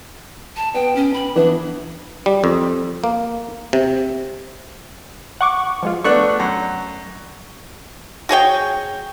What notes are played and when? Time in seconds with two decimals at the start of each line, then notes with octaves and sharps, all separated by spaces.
0.56 A5
0.74 B3 G5
0.96 C#4
1.14 B5
1.36 E3 B3 D4
2.26 G3
2.44 F2
3.04 A#3
3.73 C3
5.41 F#5 C#6 D6
5.83 F3 G#3 F4
6.04 A3 B3 D4 C#6 F#6
6.40 F#2
8.29 F#4 G#4 C#5 G5